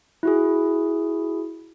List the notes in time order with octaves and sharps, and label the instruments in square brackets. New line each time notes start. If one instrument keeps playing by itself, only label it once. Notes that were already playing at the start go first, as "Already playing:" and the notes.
[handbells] E4 F#4 G#4